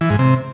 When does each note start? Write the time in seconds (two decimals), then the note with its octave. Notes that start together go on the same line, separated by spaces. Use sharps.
0.01 E3
0.10 G#2
0.19 C3